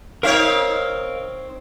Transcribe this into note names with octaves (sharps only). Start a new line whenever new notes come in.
C4 D#4 A#4 C#5 F5 F6